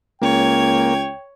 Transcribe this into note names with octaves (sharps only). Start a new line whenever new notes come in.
C#2 A#3 C#5 G5 G#6